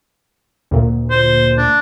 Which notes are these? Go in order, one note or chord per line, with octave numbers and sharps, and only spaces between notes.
D2 A#2
C5
D4